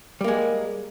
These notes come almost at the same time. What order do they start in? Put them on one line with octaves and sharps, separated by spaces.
G3 A#3 G#3